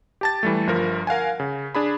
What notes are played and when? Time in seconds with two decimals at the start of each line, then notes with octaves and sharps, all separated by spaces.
0.21 G4 A5 A6
0.43 E3 G3 A3
0.67 G1 F3 A#4
1.07 A#4 F5 F#5 G#5
1.40 C#3
1.75 D4 G#4 B5